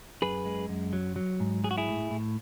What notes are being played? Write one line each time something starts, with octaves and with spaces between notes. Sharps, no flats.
F#2 G#4 B4
G#3
F#2
F#3
F#3
G#2
F#3 G#4
F#4
E4 G#4
A2
A2